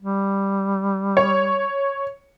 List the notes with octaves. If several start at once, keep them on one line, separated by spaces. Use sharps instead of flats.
G3
C#5